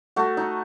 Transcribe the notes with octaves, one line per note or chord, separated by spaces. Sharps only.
A3 F#4
D#4